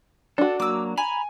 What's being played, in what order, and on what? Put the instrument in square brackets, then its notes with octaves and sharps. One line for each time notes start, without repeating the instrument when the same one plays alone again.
[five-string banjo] D4 F#4 [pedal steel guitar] A4
[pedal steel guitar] F#3 A#3 [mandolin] D6 E6
[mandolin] G#5 [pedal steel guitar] A#5 B5